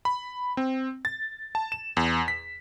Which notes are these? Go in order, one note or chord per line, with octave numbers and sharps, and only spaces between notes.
B5
C4
A6
A5
E7
E2
B6